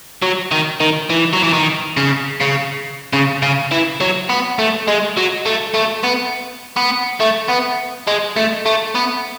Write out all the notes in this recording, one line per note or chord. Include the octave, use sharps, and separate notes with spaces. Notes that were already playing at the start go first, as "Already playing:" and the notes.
F#3
D#3
D#3
E3
F#3
E3
D#3
C#3
C#3
C#3
C#3
E3
F#3
B3
A3
G#3
F#3
A3
A3
B3
B3
A3
B3
G#3
A3
A3
B3